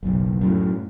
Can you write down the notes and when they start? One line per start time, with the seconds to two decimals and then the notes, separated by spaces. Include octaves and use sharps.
0.03 F#1 B1
0.41 F#2 A2